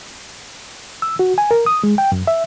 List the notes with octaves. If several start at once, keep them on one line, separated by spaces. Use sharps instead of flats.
E6
F#4
G#5
A#4
D#6
G#3
G5
F#2
E5